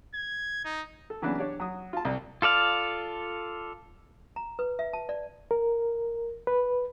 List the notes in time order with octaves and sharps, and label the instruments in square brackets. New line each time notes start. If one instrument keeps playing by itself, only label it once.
[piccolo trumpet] G#6
D#4
[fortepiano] A4
C#3 E3 F#3 B3 C#4 D4
D4 G4 C#5 D5
F#3 D#6
F4 A5
C2
[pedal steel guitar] F4 A4 D5 F5
[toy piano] A#5
B4
E5
A5
D5
[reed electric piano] A#4
B4